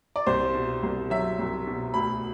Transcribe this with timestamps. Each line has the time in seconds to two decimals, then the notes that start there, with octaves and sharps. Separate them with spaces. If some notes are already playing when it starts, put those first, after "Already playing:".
0.16 D5
0.27 C2 C5
0.54 B2
0.83 C2
1.10 F#3 E5
1.39 C2
1.67 B2
1.94 D2 B5